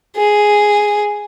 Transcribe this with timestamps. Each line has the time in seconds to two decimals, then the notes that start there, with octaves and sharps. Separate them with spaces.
0.17 G#4